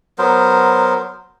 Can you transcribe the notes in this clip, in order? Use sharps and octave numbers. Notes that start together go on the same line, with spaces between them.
F#3 B3 A#4 C5